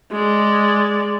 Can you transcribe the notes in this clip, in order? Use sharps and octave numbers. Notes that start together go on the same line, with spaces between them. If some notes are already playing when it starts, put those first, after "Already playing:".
G#3 D5